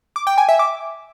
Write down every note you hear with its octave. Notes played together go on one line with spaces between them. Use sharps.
D6
G5
G#5
E5
D6